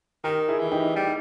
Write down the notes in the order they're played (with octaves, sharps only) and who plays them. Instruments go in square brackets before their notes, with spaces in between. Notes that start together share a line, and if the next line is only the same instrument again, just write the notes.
[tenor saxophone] D#3 [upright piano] G4 A#4
[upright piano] E4 G#4
[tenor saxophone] E3
[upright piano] D#4 G4
[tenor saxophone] G3 [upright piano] D#4 G4